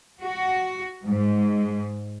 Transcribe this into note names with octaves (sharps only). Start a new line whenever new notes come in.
F#4
G#2